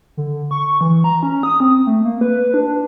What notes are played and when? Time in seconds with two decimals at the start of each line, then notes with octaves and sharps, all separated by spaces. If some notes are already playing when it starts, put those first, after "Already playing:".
0.17 D3
0.51 C#6
0.81 E3
1.04 A#5
1.23 C#4
1.43 D#6
1.60 C4
1.87 A3
2.05 A#3
2.21 B4
2.54 D4